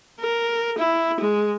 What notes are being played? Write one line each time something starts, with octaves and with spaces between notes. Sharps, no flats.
A#4
E4
G#3